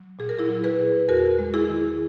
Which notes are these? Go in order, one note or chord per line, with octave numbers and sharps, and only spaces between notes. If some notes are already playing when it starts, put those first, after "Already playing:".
Already playing: F#3
A#2 G#4
A#4
E4 G#4
F#3
G#4 B4
A#2
E2 F#4 A#4
G#3
E4 G#4
D#3